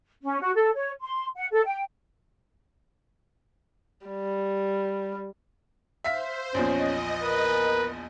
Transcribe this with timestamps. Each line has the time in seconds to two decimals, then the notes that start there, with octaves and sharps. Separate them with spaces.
0.22 C#4
0.40 F#4
0.55 A4
0.74 C#5
1.00 C6
1.35 F#5
1.51 A4
1.65 G5
4.06 G3
6.04 C5 E5 F5 B6
6.54 A#1 E2 F3 C#4 D#5
7.23 A#4 B4